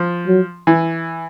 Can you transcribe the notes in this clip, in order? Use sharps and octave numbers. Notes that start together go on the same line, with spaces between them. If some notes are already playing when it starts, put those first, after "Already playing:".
Already playing: F3
F#3
E3